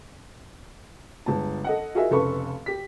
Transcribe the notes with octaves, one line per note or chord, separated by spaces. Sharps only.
G1 G#3 A5
A4 D#5 F#5
F4 F#4 G#4 A#4 D#5 E5
F1 C#3 A4 B4 C#6
G4 B6